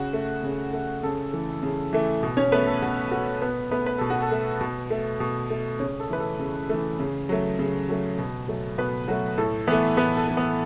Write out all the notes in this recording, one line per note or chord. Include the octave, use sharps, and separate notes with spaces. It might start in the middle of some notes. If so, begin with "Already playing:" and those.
Already playing: C#3 F#4
A3
C#3
A3
C#3 A4
E3 A3
C#3
E3 A3
B2
C#4 C#5
A3 B3 B4
A4
B2 F#4
A3 F#4
B2 B3 B4
A3 B3 B4
B4
B2 A4
F#4
A4
A3
B2
A3
B2
A3
C#3 C#4 C#5
A4
E3 A3 B4
A4
C#3
E3 A3
C#3
F#3 A3
C#3
F#3 A3
B2
F#3 A3
B2 B3 B4
F#3 A3 F#4
A2 A4
E3 A3 B3 B4
A2 B3 B4
A4
E3 A3
B3 B4